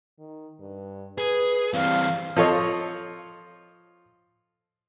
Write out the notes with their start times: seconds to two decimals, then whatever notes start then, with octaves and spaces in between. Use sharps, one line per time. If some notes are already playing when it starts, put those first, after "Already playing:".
0.19 D#3
0.60 G2
1.18 G#4 B4
1.74 E3 G3 C4 F5
2.37 F3 A4 C#5 D#5